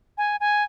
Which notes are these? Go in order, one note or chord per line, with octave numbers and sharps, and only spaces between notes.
G#5
G#5